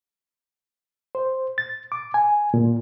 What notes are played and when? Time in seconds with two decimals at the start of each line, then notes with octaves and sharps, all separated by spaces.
1.15 C5
1.58 A6
1.92 D6
2.14 G#5
2.54 A#2